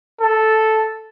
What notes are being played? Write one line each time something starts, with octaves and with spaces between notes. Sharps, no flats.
A4